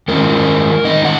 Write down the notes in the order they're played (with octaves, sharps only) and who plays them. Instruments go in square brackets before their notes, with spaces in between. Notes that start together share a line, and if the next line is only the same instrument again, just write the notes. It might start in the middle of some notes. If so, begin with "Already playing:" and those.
[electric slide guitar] D#3 G#3 C#4 F4 A#4
D#3 G#3 D#4 D#5
F#5